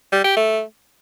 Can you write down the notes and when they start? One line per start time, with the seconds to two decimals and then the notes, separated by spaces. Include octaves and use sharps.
0.12 G3
0.24 G4
0.36 A3